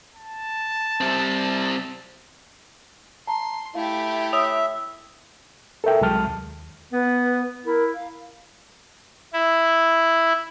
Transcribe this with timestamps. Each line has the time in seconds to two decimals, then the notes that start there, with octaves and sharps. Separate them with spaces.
0.15 A5
1.01 G3 C4
3.27 A5 A#5 C6
3.75 A3 E4 G4 F5
4.33 C#5 E5 D#6 F7
5.84 A4 A#4 E5 G5
6.01 C2 F#3 G#3 A5 F6
6.28 D#2
6.92 B3 B4
7.66 E4 A#4
7.94 F5
9.33 E4